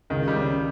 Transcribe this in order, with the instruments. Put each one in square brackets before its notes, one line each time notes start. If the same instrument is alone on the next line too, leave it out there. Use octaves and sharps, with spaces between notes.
[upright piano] C#2 [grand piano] D#3
[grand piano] G3
[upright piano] C#3